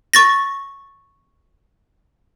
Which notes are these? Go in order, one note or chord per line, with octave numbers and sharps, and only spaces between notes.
C#6 A6 A#6